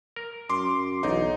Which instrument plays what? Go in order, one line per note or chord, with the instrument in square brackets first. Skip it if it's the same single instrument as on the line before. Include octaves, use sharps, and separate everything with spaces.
[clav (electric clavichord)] A#4
[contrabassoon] F#2 [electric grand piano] C6 D6
[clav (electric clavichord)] B1 [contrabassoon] E2 [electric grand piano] D#4